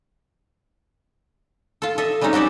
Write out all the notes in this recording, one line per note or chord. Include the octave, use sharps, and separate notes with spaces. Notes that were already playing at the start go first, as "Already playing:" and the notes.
F4 A4
A4 D#5 E5
G3 G#3 C4 C#4 D#4
F#4 G4 A4 D5 E5